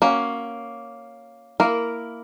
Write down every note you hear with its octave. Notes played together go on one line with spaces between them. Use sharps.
A#3 C#4 F#4
A#3 E4 A#4